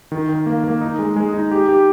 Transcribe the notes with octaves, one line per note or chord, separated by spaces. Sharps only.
D#3
D#3
A#3
A#3
D#4
G#3
G#3
D#4
G4
G4